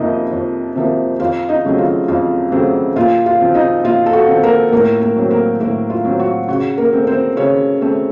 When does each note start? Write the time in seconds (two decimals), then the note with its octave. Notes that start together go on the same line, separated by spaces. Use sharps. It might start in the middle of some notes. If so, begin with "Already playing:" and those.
Already playing: F2 C3 F3 A#3 D#4 D#5
0.32 F2
0.75 C3 F3 A#3
1.20 F2 F4 F5
1.49 D#4 D#5
1.65 C#3 F#3 A3 C4
1.78 F4 F5
2.08 F2 F4 F5
2.52 C#3 F#3 A3 C4
2.96 A#2 F4 F5
3.26 F4 F5
3.40 F3 C4
3.54 D#4 D#5
3.84 A#2 F4
4.06 A4
4.13 F#4
4.28 F3 C4
4.43 A#3 A#4
4.72 A2 A#3 A#4
5.01 A#3 A#4
5.16 F#3 C4
5.31 A#3 A#4
5.60 A2 A#3 A#4
5.90 F4
6.05 F#3 C4
6.19 F#4
6.48 C#3 F#4
6.78 A#3 A#4
6.93 A3 C4
7.07 C4 C5
7.37 C#3 C#4 C#5
7.81 A3 C4